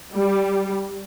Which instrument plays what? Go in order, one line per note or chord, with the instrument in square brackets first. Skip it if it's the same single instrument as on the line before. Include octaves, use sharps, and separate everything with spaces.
[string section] G3